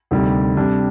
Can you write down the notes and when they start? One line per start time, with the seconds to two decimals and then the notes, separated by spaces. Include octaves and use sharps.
0.11 D2 C3 D#3 G3
0.57 C3 G3 D4